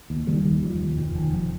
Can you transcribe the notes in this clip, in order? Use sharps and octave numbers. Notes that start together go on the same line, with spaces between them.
D#2
F1 D#3 G3
D#2
D#2 F3
F1
F1 D#3
F1
F1 F3